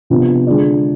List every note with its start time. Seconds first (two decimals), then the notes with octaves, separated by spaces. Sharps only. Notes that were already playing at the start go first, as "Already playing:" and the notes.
0.10 C3 F3 B3 D4 F4
0.47 D3 G#3 D4 F4